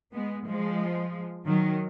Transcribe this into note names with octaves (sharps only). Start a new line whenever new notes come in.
G#3 B3
F3 G#3
D#3 F#3